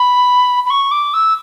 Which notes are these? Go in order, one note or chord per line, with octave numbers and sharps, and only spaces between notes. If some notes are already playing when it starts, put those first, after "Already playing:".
Already playing: B5
B5
C#6
D6
E6